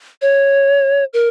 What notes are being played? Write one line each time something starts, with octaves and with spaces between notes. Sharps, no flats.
C#5
A#4